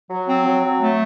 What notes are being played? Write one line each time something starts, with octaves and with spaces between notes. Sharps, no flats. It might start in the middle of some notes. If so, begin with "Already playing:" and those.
F#3
C4
F#3
F#3
A3